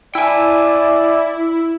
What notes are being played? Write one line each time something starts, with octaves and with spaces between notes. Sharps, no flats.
E4 D5 E5 G5 G#5